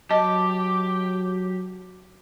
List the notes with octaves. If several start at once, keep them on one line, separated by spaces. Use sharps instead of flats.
F#3 G4 D#5 A5